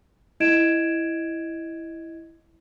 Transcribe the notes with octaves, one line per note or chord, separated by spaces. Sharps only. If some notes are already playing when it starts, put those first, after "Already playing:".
E4 D#5 G#6 D7 E7